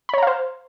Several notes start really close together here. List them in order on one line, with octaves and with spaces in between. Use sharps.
B5 C#5 A#5 F5 C5